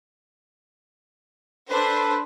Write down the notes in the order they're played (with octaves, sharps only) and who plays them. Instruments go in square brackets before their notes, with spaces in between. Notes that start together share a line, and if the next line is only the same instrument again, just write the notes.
[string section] D4 C5 [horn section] A4 B4